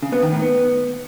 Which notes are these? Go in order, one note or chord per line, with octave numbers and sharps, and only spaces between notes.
C#3
B3
D#3
A2
B3